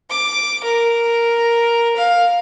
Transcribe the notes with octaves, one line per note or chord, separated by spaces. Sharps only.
D6
A#4
F5